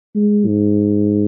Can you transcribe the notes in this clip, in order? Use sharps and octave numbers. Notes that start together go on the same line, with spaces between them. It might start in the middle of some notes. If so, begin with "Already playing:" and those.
G#3
G#2